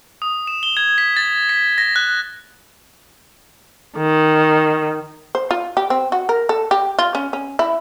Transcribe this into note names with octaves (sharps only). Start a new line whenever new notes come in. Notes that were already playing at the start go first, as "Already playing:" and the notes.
D#6
E7
G7
G#6
B6
A6
B6
A#6
F#6
D#3
C5
F4
G4
C4
F#4
A#4
A4
G4
F4
C#4
C#4
E4